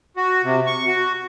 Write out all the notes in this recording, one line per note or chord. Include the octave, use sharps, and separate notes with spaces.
F#4
C3
C#6
F#4